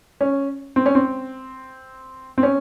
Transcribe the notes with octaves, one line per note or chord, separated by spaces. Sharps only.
C#4
C4
C#4
C4
C4
C#4